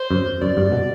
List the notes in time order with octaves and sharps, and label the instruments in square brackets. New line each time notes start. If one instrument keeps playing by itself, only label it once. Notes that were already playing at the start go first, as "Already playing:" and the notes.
Already playing: [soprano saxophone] C5
[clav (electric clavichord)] F#2
[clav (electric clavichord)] F#2 [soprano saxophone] D5
[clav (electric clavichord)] G2
B2